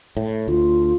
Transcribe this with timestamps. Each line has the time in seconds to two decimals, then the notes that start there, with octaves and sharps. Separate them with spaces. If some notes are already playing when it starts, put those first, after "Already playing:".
0.17 A2
0.48 D2 F4